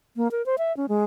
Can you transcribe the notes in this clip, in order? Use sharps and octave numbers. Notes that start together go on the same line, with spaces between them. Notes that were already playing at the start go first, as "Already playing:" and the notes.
A#3
A#4
C5
E5
C#4
G#3